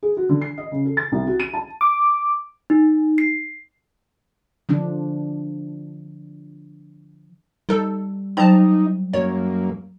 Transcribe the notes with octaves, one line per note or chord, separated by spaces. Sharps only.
G#4
F#4
D3
C7
D#5
C#3
A4
A6
C2
F#4
D#7
A5
D6
D#4
C7
D3 F3 D4
G3 D#4 A4
F#3 D#4 C5 G5 A5 A#5
F#2 A#3 C#5